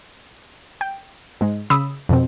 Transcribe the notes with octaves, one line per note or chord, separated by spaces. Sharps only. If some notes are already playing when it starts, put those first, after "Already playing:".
G5
G#2 G#3
C#3 B5 D#6 E6
F2 B2 C4